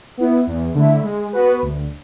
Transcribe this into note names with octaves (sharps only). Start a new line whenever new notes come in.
B3 E4
E2
D3 A3 E4
G#3
B3 F#4 B4
D2